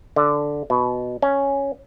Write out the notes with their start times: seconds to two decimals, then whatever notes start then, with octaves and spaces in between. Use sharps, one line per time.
0.16 D3
0.70 B2
1.22 C#4